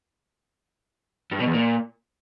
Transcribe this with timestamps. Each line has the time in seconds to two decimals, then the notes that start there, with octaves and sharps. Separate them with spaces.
1.31 G2
1.39 B2
1.46 E2
1.54 A#2